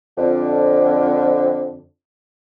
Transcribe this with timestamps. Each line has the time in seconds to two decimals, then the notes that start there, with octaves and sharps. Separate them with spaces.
0.17 F2 D3